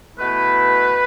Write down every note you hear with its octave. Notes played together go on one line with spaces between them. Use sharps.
B2 A3 E4 B4